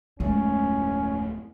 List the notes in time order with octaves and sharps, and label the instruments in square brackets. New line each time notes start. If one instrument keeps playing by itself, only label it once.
[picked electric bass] D1 F2 A3 [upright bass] G#3 E4 [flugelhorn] C#4